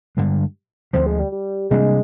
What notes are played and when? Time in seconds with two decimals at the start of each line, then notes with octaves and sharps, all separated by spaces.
0.17 G2 D3 G#3
0.93 D2 D3 F3 C4
1.06 G#3
1.19 G3
1.32 G3
1.70 C3 G3 G#3 A#3 D4